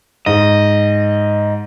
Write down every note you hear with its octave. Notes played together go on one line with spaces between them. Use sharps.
G#2 D#5